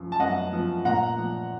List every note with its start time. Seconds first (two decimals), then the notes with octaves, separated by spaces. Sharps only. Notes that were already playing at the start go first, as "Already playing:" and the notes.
Already playing: F#2 F3
0.12 A5
0.20 F#2 D#5 F#5
0.53 F3
0.85 A#2 F#5 A#5
1.18 F3